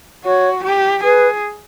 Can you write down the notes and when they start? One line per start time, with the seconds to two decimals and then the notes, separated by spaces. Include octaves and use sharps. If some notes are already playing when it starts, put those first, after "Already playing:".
0.25 F#4 C#5
0.63 G4
1.03 G#4 B4